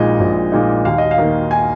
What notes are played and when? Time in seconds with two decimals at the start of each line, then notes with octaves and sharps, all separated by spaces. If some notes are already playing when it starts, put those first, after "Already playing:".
Already playing: A#1 A#2 G#3 D#4 D#5
0.20 A#1
0.52 A#2 G#3 D#4
0.85 D#2 F5
0.98 D#5
1.11 F5
1.18 D#3 A#3
1.51 G#5